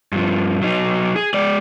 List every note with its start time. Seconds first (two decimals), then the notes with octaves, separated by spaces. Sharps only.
0.12 G2 F3
0.61 F#3 D#4
1.16 G#4
1.34 G#3 D5